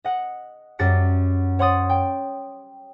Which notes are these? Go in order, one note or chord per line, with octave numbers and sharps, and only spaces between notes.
D#5 F#5
F#2 G3 G4 A6 A#6 C#7
C#5 F#5 C6 D#6 A6
G5